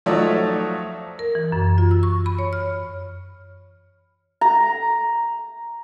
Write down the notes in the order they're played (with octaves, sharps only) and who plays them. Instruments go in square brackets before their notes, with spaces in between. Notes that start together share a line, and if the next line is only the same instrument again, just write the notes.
[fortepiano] F3 F#3 A3 D#4 D5 E5
[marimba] A#4
E3
F#2
F4
E6
C#6
B5
C#5
F6
[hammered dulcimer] A#5